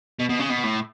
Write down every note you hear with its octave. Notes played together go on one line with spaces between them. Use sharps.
B2
B2
C#3
B2
A2